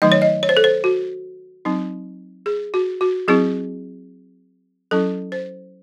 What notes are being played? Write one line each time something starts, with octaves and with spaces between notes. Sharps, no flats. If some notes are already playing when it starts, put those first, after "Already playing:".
D#3 F#3 A3 D#4 D#5
C#5
D#5
C#5
C5
A4
C5
F#4
F#3 C4 D#4
G#4
F#4
F#4
F#3 C4 E4 G#4
F#3 C#4 E4 A4
C5